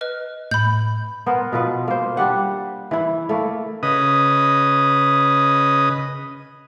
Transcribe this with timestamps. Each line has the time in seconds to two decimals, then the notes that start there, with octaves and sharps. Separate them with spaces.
0.01 B4 D#5 F6
0.51 A2 B5 G6
1.26 B3 A#4 C5 F#5
1.52 B2 F3 B4
1.88 A#3 C5
2.17 G3 D4 G4 F#5
2.91 E3 E4
3.29 A3 A#3 E4
3.83 C#3 B4 D#5 D#6